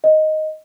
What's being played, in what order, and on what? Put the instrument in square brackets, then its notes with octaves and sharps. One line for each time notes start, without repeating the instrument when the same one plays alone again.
[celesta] D#5